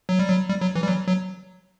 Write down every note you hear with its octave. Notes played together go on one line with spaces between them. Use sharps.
F#3
G3
F#3
G3
F#3
E3
G3
F#3
F#3